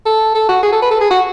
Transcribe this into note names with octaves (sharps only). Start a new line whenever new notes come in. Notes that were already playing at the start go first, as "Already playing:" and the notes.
A4
A4
F#4
G#4
A4
B4
A4
G#4
F#4